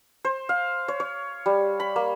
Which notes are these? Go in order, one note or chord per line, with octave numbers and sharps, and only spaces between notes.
C5
F5
C#5
C#5
G3
B5
A#3